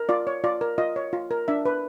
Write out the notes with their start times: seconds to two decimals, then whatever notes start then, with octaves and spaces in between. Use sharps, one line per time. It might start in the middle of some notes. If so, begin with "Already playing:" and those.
Already playing: A#4
0.09 F4 D5
0.27 C#5
0.44 F4 D5
0.61 A#4
0.78 F4 D#5
0.96 C#5
1.13 F4
1.31 A#4
1.48 D4 E5
1.65 B4